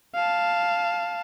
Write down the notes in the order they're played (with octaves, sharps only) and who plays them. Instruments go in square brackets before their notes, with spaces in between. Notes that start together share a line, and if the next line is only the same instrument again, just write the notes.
[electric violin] F5 A5